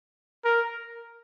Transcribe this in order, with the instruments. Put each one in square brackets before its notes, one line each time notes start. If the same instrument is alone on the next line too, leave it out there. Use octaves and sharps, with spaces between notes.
[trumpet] A#4